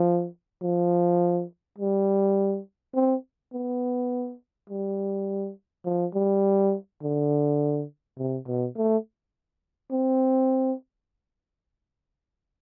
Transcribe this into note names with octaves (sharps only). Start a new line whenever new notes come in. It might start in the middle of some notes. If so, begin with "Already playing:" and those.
Already playing: F3
F3
G3
C4
B3
G3
F3
G3
D3
C3
B2
A3
C4